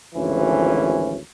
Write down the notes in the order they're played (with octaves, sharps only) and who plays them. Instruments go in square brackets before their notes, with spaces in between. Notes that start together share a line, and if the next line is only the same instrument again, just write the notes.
[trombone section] G#1 D2 E3 F3 C#4